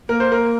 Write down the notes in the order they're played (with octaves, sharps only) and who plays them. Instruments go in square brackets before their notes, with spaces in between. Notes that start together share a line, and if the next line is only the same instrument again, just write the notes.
[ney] A#3 [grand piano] A#4
[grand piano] C5
A#4